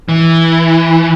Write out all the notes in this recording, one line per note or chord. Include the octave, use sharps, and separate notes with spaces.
E3